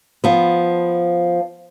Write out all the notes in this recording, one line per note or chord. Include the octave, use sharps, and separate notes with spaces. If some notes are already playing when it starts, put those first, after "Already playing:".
F3 B3